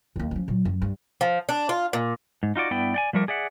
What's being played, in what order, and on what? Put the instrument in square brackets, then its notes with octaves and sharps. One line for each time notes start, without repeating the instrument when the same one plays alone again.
[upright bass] D#2 A#3
F3 C#4
A#2 F#3
F#2
G2
[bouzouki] F3
D4
F4
A#2
[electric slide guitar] G#2
D#4 F4 F#4 D5
G2 B3 E4 D5 G5
D5 G5 G#5
F3 G3 A3 A#4 D5
G#4 D5 E5 F#5